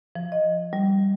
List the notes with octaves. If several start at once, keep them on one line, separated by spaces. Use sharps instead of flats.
F3
D#5
G3